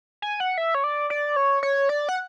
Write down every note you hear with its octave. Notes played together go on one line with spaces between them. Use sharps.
G#5
F#5
E5
C#5
D5
D5
C#5
C#5
D5
F#5